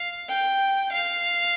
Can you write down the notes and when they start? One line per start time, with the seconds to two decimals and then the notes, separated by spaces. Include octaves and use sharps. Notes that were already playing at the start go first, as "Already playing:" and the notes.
Already playing: F5
0.29 G5
0.92 F5